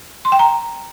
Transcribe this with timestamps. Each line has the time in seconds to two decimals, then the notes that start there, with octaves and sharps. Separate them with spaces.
0.25 C6
0.32 G5
0.39 A#5